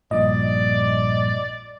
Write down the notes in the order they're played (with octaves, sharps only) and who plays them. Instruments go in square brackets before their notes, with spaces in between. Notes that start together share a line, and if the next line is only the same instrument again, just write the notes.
[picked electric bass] A#1 G2 A#2 [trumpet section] D5 [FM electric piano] D#5